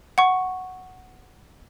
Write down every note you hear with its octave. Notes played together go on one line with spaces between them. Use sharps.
F#5 C#6